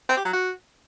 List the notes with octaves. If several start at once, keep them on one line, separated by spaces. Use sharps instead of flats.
C4
G4
F#3
F#4